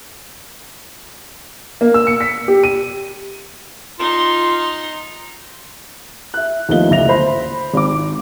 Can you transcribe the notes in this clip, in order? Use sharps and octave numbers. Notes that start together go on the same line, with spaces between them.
A#3
E6
C#7
B6
G4
D#7
D#4 F4 C6
E5 F#6
D#2 F3 A3 B3 D#5 G7
F#1 D2 E5 A#6 F7
C5 B5
G#1 D6